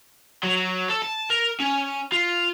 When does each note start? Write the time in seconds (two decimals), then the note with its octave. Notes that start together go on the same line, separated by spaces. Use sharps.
0.43 F#3
0.89 A4
1.02 A5
1.30 A#4
1.60 C#4
2.12 F4